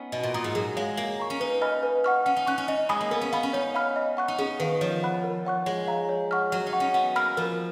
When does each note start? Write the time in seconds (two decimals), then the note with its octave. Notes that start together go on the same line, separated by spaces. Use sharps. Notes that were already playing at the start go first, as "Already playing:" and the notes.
Already playing: B3 C#4 D#4
0.12 B2 D#5
0.23 A#2
0.34 A#2 A#5 D#6
0.44 G#2
0.55 F#3 G#4
0.76 G#3 C#5 F5
0.97 A#3 F5
1.19 A#5 C#6
1.30 C#4
1.40 D#4 B4
1.61 D#5 G#5 B5 F6
1.83 B4
2.04 F#5 C#6 F6
2.26 C#4 F#5
2.37 D#4
2.47 C#4 C#6 F#6
2.58 C#4
2.68 C#4 D#5
2.89 G#3 G#5 B5 D#6
3.00 A#3
3.11 B3 A#4
3.21 C#4
3.32 B3 F5 B5
3.43 C#4
3.53 D#4 C#5
3.74 F5 B5 F6
3.96 D#5
4.17 F#5 C#6 F#6
4.28 D#4
4.38 C#4 G#4
4.60 D#3 B4 F5
4.81 F3 C#5
5.03 F#5 B5 F#6
5.24 A#4
5.45 C#5 F#5 C#6 F#6
5.66 G#3 C#5
5.88 F5 A#5
6.09 C#5
6.31 F#5 C#6 F6
6.52 F#3 C#5
6.67 D#4
6.73 F#5 C#6
6.80 C#4
6.94 B3 F#5
7.16 A#3 B5 F6
7.37 F3 A#4